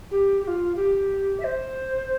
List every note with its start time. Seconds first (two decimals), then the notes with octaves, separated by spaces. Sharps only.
0.11 G4
0.43 G4
0.48 F4
0.76 G4
1.40 E5
1.44 C5